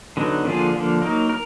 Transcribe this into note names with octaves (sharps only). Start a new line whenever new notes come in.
D3 F#3 B3 D#4
D3 F3 A#3 F4 G#4
D3 F3 A#3
F#3 A#3 D#4 A#4
A#4